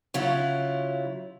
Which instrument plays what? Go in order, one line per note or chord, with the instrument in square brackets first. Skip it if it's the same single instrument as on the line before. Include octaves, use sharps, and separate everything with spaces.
[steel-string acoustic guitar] C#3 F#3 E4 F4